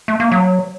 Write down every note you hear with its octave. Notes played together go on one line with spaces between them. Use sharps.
A3
A#3
F#3